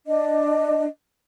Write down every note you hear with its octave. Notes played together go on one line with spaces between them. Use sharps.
D4 D#5